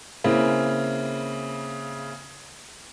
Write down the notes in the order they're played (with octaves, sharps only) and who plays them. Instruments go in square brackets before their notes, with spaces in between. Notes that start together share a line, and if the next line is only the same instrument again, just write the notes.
[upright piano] C#3 A#3 C4 E4